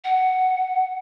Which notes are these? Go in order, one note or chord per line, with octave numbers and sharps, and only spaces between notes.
F#5